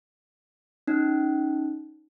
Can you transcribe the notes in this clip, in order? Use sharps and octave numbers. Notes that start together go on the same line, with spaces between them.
C#4 D#4